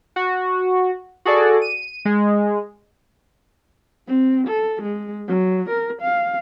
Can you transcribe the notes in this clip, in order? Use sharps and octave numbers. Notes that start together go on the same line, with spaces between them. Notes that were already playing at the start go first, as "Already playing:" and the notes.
F#4
F#4 G#4 A4 D5
D#7
G#3
C4
A4
G#3
F#3
A#4
F5